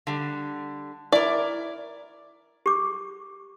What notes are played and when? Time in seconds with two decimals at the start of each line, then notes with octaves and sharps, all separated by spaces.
0.07 D3 G3
1.12 E4 A#4 D5
2.66 G4 D6